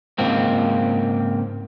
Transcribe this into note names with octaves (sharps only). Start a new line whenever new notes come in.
C#2 G#2 A#3 C4